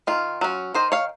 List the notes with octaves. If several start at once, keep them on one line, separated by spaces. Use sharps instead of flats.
D#3 F4
F#3 C#4
D#3 C5 D#5
C#5 F5